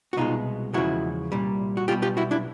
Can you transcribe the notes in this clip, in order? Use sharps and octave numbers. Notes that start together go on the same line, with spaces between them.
F#4
C2 B2 G#3 D#4 F4
E2 C#3 F3 G#3 E4 F#4
C2 A#2 G3
F#4
B1 B2 G3 F4 G4
F4 G4
E4 F#4
D4 E4